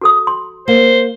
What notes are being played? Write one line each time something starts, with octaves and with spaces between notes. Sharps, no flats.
F#4 A4 D#6
C6
A#3 C5